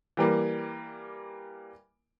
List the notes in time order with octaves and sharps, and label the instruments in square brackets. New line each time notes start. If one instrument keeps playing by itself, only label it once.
[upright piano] E3 G3 A#3